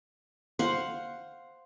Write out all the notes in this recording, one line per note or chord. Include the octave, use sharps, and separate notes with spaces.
C5 F5 F#5